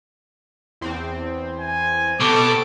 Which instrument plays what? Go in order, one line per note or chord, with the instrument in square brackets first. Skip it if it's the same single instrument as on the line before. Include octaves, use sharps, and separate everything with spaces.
[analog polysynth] E2 C4
[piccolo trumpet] G#5
[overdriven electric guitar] B2 [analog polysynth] C4 G4 A5 [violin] A4 [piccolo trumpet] D6